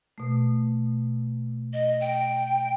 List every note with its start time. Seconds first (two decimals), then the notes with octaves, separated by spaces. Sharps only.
0.18 B2 A3
1.73 D#5
2.01 G5